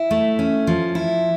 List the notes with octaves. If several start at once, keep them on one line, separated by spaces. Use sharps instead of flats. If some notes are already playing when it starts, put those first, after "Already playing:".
Already playing: E4
A3
C#4
F3
E4